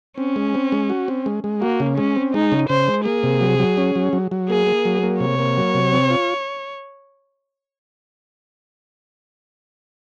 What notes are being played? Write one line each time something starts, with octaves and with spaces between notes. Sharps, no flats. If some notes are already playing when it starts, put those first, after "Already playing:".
C4 C#4
G#3
C4
G#3
F#4
C4
G#3
G#3
A#3 F#4
C#3
G#3 C#4
C4
G#3 D#4
C#3
C#3 C5
G#3
A#3 G#4
C3
F#3
F#3
C#4
F#3
F#3
F#3
A#3 G#4
A#3
F#3
A#3
C3 C#5
A#3
F#3
C3
C4
F4